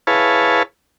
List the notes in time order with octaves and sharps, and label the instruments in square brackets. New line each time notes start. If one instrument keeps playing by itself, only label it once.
[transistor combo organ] E4 G#4 B4 C#5 F5 A5